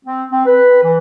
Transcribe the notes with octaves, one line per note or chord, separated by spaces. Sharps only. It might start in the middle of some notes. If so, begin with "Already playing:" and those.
C4
C4
B4
E3